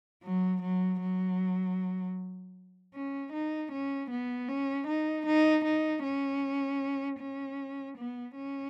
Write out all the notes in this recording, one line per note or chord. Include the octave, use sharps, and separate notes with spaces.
F#3
F#3
F#3
C#4
D#4
C#4
B3
C#4
D#4
D#4
D#4
C#4
C#4
B3
C#4